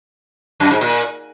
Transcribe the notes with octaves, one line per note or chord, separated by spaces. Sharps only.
F#2
G#2
A#2